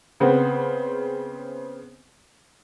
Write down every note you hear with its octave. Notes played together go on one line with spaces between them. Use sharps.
C#3 B3 C4